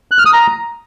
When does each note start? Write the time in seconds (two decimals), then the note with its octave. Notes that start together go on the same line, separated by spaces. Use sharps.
0.11 F#6
0.19 F6
0.26 D#6
0.33 A#5